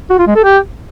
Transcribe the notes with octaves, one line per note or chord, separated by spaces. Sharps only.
F#4
F4
G#3
A4
G4